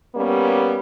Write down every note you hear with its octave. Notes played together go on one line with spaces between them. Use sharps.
G3 A#3 B3 C#4